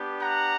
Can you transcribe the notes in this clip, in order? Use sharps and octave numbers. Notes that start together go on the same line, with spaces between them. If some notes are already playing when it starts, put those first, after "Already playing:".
Already playing: B3 D4 G4
F#5 A#5